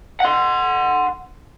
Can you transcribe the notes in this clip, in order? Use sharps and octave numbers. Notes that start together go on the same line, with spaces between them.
F#5 C6